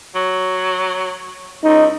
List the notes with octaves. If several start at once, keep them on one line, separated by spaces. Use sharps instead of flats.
F#3
C#2 D#4